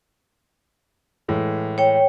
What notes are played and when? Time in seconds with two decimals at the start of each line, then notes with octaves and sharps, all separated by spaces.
1.28 A2 E3 G#3
1.78 C#5 G5